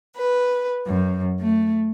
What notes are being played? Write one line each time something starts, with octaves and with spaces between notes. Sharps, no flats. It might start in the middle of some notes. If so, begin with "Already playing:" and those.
B4
F#2
A3